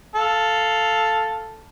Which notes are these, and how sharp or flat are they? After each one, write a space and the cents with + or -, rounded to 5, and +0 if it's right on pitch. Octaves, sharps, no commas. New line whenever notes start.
A4 +0 F5 +0